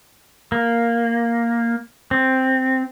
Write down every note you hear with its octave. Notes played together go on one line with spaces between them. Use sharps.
A#3
C4